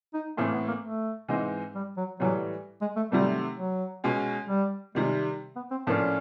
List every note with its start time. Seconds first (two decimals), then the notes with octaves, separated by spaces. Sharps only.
0.14 D#4
0.37 A2 E3 A3 A#3 C4
0.47 A#3
0.53 B3
0.68 A#3
0.84 A3
1.29 G#2 E3 G#3 C4 D#4
1.75 G3
1.97 F#3
2.20 A2 E3 F#3 G3
2.82 G#3
2.96 A3
3.11 C3 D#3 F#3 G3 A3 C4
3.57 F#3
4.04 B2 G#3 C#4
4.49 G3
4.95 C3 D#3 G3 G#3
5.56 B3
5.71 C4
5.86 A2 F3 A#3 C#4 D4 F4